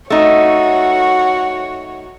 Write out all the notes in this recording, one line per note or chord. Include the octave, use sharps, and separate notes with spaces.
A3 D#4 F#4 C#5